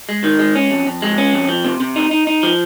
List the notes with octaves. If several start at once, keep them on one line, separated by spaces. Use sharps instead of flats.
G#3
D#3
G#3
C#4
F2
F2
G#3
C#4
F2
F3
C3
C3
D#4
D#4
D#4
F3